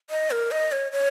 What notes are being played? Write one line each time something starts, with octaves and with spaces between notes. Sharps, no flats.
D#5
A#4
D#5
C#5
C#5